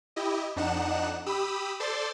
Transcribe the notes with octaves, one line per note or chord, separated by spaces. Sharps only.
E4 G4 D#5
F2 D4 D#4 F#5 F#6 E7
G4 B5 D#6 E6
A4 C5 D5 C6 A6